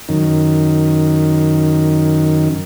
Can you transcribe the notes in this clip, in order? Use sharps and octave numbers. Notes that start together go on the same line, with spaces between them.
F#2 D#3